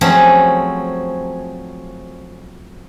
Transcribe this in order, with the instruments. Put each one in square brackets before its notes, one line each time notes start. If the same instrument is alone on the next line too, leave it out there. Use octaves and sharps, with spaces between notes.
[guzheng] F3 F#3 A3 C4 C#4 G#4